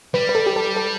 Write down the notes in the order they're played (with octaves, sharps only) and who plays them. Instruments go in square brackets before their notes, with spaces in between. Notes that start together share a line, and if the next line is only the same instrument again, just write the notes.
[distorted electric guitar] G3 [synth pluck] B4
[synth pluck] B4
A4
G4
A4
A4